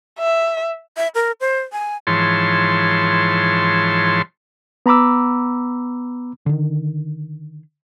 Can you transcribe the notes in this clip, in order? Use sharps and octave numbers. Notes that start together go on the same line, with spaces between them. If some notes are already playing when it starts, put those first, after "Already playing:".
E5
E5
A#4
C5
G#5
G#2 E3 F3 C#5 A5 C6
B3 A#5 B5 D6 E6
D3 D#3